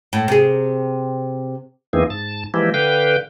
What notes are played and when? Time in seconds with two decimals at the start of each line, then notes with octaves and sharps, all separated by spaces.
0.13 A2
0.28 C3 G#4
1.93 E2 E3 A#3 C4 D#4 G#4
2.10 G#2 A5
2.54 E3 F3 G#3 A#3 E4 G4
2.74 D3 B4 F5 G5 G6